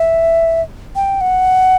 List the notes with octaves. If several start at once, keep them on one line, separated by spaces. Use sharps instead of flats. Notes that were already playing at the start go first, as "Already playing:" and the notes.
Already playing: E5
G5
F#5